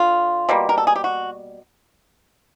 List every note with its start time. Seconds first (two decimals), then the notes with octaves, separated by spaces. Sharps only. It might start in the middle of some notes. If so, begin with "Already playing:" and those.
Already playing: D3 F4
0.49 B2 G3 A#3
0.69 A#4
0.78 A4
0.87 G#4
0.96 G4
1.04 F#4